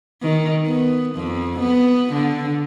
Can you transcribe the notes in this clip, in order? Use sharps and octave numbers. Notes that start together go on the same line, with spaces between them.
D#3
B3
F2
B3
D3